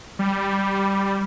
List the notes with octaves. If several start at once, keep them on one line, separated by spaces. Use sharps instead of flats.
G3